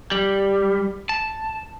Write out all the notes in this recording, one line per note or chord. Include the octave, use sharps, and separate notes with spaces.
G3
A5